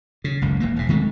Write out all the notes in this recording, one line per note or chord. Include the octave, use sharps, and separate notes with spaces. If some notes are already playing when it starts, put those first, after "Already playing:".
C#3
F#1 C#2 A2
D#1 E3 A#3
E1 G#2
D#3 G#3 A3 C4